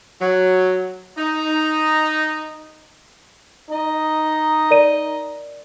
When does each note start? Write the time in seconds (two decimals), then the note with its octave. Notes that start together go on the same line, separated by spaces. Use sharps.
0.20 F#3
1.17 D#4
3.69 D#4 D#5
4.70 A#4 D5 D#7